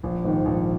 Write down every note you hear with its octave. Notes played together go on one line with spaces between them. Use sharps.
A#1
G#2 D#3
A#1